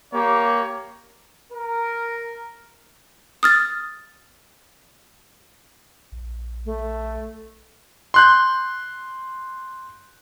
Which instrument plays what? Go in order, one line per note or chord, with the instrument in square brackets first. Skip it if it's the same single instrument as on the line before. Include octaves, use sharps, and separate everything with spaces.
[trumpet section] A#3 G4 C#5
[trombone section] A#4
[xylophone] D#6 F6 A6
[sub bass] A#1
[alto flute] A3
[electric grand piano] C6 F#6 G6